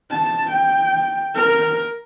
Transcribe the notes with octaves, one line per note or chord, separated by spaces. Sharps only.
A5
G5
A#4